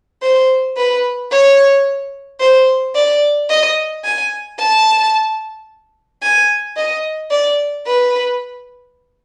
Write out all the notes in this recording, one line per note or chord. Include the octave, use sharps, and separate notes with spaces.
C5
B4
C#5
C5
D5
D#5
G#5
A5
G#5
D#5
D5
B4